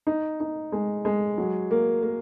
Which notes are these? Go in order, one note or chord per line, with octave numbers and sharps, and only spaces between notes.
D#4
D#4
G#3
G#3
F#3
A#3
A#3